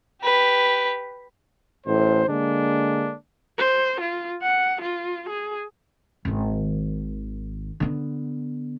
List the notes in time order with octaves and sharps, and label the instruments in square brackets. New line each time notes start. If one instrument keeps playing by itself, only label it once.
[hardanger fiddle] G4 B4
[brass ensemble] A1 A2 C5
D3 G#3 A#3 D4
[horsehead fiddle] C5
F4
F#5
F4
G#4
[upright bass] G#1 D#3
D3 B3